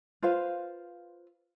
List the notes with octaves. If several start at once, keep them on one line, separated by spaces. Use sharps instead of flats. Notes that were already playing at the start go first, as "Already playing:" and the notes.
F4 B4 C5 F5